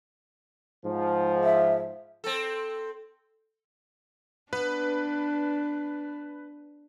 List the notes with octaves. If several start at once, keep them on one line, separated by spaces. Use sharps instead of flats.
G#2 F3
E5
C4 A4
B3 D4 B4